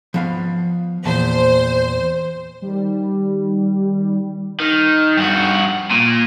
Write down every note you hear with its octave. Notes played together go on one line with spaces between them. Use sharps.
F3 B3 F5
E2 A#2 C5 A5
D#3 G3
D#3
G2 F#4
A#2